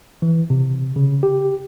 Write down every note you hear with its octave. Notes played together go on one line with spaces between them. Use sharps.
E3
C3
C#3
G4